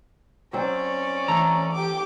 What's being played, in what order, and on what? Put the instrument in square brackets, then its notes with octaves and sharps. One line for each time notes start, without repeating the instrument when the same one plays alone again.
[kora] F#3 C4 [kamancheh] C#4 D5
[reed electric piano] E3 [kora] A3 A4 [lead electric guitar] A#5
[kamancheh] G4 D6